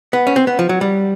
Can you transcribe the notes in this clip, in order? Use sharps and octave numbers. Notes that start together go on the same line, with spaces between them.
B3
C#4
C4
B3
F3
F#3
G3